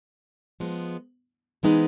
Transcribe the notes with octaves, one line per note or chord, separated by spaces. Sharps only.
F3 G#3 B3
C3 E3 G#3 B3 D#4